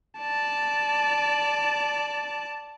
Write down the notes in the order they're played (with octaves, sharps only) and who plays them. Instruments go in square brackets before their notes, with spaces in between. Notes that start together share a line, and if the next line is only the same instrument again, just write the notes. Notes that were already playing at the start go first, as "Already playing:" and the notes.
[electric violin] D5 A5